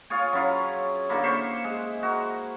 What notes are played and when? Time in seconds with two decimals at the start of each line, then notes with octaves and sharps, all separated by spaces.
0.10 F4 G#4 C#5 G#5
0.33 F#3 C#4 E4 F4
1.09 D3 A#3 E4
1.23 C5 E5 C#6
1.64 G#3
2.03 F#4 A#4